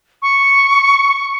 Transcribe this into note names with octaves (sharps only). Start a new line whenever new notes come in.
C#6